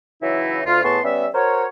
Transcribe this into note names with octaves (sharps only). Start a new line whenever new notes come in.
C#3 E3 F#3 D#4 E4
D2 F4
A2 B3 G#4 A5 C6 C#6
G3 B3 C#4 E5
F#4 A#4 C5 C#5